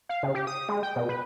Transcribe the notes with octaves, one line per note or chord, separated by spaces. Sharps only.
F5
C#3
G4
D#6
G#3
G5
B2
B4